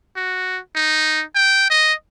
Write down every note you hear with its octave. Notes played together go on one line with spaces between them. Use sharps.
F#4
D#4
G5
D#5